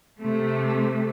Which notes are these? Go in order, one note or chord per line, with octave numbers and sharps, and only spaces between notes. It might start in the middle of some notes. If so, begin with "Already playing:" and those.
C3 A3